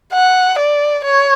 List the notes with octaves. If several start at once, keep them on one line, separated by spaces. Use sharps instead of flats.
F#5
D5
C#5